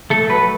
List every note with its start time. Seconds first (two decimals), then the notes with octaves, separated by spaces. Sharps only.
0.10 A3 A4
0.30 F#3 B4